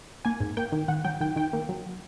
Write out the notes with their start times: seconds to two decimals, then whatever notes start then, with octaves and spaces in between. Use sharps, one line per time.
0.25 A#3 G#5
0.40 G#2
0.57 A#3 G5
0.72 D#3
0.88 D#3 F#5
1.05 F#3 G5
1.21 D#3 G5
1.36 D#3 G5
1.53 A#3
1.69 F#3